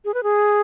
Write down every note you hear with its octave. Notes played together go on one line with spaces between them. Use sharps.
G#4
B4
G#4